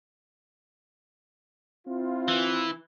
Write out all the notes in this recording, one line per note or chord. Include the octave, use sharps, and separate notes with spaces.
C4 E4 F4
E3